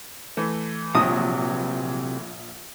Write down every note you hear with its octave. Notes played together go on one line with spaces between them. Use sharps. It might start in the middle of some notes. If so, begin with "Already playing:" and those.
E3 A3
A#1 C3 F#3 D#6